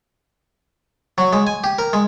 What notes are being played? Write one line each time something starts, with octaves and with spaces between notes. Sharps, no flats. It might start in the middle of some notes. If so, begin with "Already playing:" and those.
F#3
G#3
G#5
G4
A#4
G#3